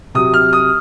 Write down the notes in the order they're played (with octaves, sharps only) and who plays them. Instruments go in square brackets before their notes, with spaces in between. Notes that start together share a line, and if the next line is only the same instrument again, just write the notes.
[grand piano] C3 F#3 D#6
F6
D#6